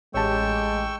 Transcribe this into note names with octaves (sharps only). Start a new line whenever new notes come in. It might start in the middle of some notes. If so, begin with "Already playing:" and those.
A1 G#3 G4 C#5 G5 A5 C#6 E6